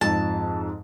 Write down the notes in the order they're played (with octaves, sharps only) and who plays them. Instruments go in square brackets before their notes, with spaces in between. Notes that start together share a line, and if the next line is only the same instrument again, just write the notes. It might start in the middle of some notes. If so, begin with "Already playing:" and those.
[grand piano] F2 [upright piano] G#2 [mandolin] A5